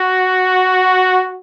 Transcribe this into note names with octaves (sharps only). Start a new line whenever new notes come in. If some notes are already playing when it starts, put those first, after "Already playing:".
Already playing: F#4